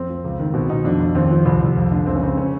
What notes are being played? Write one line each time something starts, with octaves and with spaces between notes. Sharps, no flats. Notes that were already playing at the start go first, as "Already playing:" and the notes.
Already playing: F2 C4
F3
C#2
D#3
B2 C4
B2 D#4
F2 D4
F2
D#2 C4
F3
C2
C2
F2
D3
C#2 C4
C#4
C#2 C4
C#4